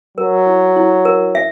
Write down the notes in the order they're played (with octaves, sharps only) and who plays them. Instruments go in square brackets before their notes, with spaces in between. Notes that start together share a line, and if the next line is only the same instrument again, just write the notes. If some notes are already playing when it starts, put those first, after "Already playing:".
[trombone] F#3 [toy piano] A#4
[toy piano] E4
E4
A#4
E5